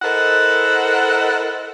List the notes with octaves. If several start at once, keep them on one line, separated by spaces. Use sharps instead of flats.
E4 A4 A#4 C5 D#5 F#5